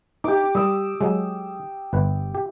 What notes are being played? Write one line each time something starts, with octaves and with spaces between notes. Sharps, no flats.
D#4 G4 D6
G3 D#6 E6
F#3 G#3
G1 B4
G4